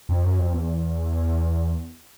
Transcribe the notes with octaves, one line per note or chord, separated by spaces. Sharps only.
F2
F#2
F2
E2